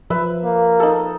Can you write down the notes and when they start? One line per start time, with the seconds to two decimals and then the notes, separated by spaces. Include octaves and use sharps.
0.10 F3 B4 E5
0.44 A#3
0.80 D#4 A4